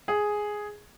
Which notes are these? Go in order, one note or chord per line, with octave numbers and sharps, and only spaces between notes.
G#4